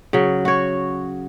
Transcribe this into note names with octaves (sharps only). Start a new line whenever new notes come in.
C#3 F#3
F#4 C#5